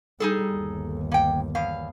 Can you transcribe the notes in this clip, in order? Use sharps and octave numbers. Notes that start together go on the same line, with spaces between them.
G3 D#4 G#4 A4
G1 D#2
A#3 G5
E2 F5